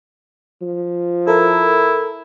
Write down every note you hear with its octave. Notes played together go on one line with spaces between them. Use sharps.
F3
E4 A4 A#4